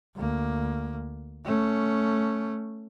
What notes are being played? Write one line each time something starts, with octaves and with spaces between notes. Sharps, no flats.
D2 A#3
A3 C#4